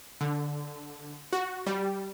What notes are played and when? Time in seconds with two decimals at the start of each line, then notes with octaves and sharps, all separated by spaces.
0.21 D3
1.33 F#4
1.67 G3